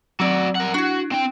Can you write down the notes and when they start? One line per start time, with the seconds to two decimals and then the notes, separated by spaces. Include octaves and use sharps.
0.20 F#3 C4 F#4 D5
0.55 A#4 F#5
0.74 D4 E4 F#4
1.11 C4 G5